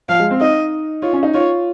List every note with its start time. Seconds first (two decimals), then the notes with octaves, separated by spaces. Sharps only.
0.09 F3 F5
0.20 G#3
0.31 C4
0.40 D#4 D#5
1.02 F4 C#5
1.13 C#4
1.23 D#4
1.34 F4 C#5